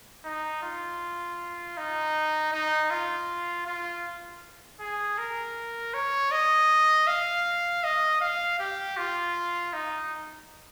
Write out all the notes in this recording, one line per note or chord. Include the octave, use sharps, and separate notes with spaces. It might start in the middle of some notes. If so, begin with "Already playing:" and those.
D#4
F4
D#4
D#4
F4
F4
G#4
A#4
C#5
D#5
F5
D#5
F5
G4
F4
D#4